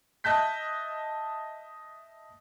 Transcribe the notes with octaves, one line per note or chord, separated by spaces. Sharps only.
D#5 E5 A5 F#6 G6 B6